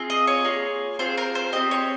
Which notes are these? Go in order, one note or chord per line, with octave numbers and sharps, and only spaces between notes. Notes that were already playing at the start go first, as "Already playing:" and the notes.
Already playing: C4 F4 G#4
D#5
C#5
A#3 F4 G#4
C4 F4 G#4 C5
A#4
C5
C4 G4 D#5
C#5